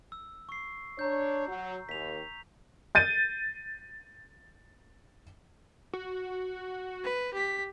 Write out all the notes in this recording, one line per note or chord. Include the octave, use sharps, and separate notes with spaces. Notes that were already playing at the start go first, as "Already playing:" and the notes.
E6
C#6 C7
D4 C#5 A#5 G6
F#3
D#2 B6 F7
G6 A6 D#7
F#4
B4
G4 B6